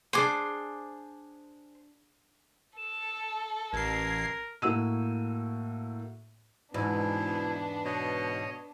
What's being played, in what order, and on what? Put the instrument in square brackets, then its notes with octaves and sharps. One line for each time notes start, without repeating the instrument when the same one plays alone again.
[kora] D4 G#4 F#5 [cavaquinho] C5 G#5 D6
[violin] A4 [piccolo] E7
[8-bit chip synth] A1 C7 [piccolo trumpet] A#4 [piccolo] G#6
[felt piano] A2 A#3 F#4 E6 D#7
[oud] E2 G#2 [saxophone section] B2 [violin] B3 D4 [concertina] E4
[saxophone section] B2 [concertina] C#5 D#5